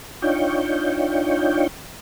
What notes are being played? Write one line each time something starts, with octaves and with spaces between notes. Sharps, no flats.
D4 D#4 F4 C#5 G5